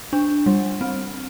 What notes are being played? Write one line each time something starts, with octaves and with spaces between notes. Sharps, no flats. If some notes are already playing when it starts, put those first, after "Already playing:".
D4
G3
C4